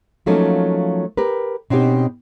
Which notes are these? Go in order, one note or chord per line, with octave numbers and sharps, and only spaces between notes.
F3 F#3 A3 A#3 C#4 D#4
G4 A#4 B4
B2 C4 C#4 D#4 G4